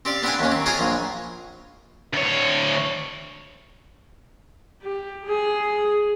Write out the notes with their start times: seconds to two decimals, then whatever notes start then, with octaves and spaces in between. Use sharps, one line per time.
0.05 C4 G4 D5 F5
0.23 B3 C4 D4 F5 F#5 G#5
0.39 D#2 C#4
0.52 C4
0.66 F4 G#4 C5 C#5 G#5 A#5
0.79 A#1
2.13 D2 C#5
4.82 G4
5.26 G#4